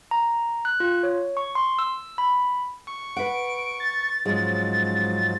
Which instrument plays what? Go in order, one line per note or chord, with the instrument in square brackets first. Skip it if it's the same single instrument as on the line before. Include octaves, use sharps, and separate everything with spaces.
[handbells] A#5
F#6
F4
C#5
C#6
C6
E6
B5
[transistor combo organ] C#6
[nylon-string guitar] B4 F#5 [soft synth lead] D7
[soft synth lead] A6
[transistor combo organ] G#2 F3 F#3 [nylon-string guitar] G#3 C#4